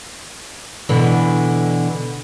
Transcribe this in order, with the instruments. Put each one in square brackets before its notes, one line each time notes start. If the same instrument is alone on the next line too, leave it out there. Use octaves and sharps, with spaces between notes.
[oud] B2 D3 E3